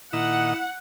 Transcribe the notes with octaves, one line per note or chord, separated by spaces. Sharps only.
A#2 D#3 E4 D#5 F#5